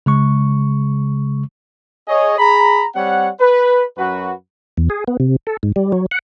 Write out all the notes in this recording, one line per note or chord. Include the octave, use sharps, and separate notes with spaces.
C#3 G#3 C#6
G#4 C#5 D#5
G#4 A#5 B5
G3 C4 C#5 F#5
B4
F#2 F#4 B4
E2
G#4
B3
C3
A4
G#2
G3
F#3
F#5